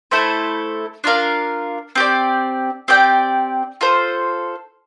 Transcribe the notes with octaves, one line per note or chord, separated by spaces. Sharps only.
A3 E4 A4 C5
D4 F4 A#4 F5
C4 G4 D5
C4 G4 D5 G5
F4 A4 C5